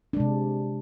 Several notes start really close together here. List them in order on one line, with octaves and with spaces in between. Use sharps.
D4 G#3 C3